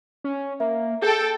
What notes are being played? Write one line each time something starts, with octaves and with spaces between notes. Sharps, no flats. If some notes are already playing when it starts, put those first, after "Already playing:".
C#4
A#3 E5
G#4 A4 G5 G6